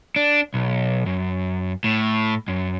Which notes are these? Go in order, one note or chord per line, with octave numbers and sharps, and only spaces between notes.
D4
B1
F#2
A2
F#2